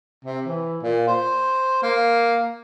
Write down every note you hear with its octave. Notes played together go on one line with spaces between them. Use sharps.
C3
E3
A#2
C5
A#3